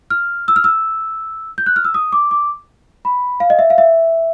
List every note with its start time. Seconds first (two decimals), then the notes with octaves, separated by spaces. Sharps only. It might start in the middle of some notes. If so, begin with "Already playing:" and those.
0.10 F6
0.48 E6
0.56 F6
0.64 E6
1.58 G6
1.66 F#6
1.76 F6
1.85 E6
1.94 D#6
2.12 D6
2.31 D6
3.05 B5
3.40 F5
3.50 D#5
3.59 E5
3.70 F5
3.78 E5